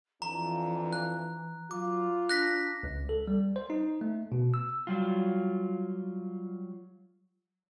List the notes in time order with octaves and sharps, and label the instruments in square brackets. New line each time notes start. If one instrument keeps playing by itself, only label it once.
[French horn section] F2 D4 F4 [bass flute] E3 [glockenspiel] A#5
[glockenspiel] F#6
[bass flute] F#3 [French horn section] F4 [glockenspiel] D6
[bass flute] D4 [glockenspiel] F#6 A#6 B6
[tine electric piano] C#2
A4
G3
C5
D#4
A3
B2
E6
[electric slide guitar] F#3 G3 F4